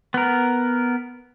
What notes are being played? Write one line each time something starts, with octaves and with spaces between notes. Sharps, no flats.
B3 A#4